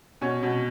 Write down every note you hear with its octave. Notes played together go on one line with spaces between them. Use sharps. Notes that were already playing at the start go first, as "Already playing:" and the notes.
B2 C#4
B2